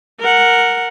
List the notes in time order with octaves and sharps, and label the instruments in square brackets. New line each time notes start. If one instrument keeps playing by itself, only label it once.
[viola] A#4 F#5